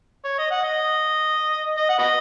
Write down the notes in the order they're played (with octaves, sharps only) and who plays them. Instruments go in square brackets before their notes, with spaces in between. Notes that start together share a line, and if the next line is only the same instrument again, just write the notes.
[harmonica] C#5
D#5
F#5
D#5
D#5
F#5
F#4 B4 D#5